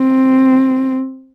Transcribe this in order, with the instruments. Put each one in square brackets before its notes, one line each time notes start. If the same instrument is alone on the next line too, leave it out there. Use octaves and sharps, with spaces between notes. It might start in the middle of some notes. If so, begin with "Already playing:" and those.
Already playing: [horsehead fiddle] C4